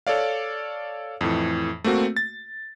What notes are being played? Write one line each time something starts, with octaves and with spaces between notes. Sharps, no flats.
A4 C#5 D5 F5
F2 A2 E3
A3 A#3 C4 F#4
A6